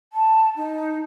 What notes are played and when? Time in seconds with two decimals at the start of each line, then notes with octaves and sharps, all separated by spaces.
0.13 A5
0.56 D#4